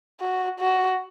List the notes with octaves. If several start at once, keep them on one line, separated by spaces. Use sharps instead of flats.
F#4
F#4